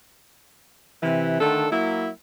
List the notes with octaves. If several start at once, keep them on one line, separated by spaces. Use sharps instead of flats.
C3 E3
D3 D#3 A3 D4 A4
F#3 A#3 E4